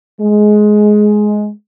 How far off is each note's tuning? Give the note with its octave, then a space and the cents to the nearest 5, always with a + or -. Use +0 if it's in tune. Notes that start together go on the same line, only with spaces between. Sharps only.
G#3 +15